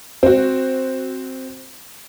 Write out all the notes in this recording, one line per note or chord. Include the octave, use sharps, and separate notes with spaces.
C4 F#4